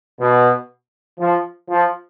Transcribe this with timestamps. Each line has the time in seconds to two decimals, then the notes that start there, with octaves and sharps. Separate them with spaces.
0.19 B2
1.19 F3
1.70 F3